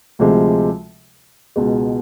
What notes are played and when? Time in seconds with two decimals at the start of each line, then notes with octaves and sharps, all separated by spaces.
0.19 D2 C3 F3 G#3
1.56 C#2 B2 G#3